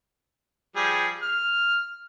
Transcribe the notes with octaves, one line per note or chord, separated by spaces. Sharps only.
F3 G3 G#4
F6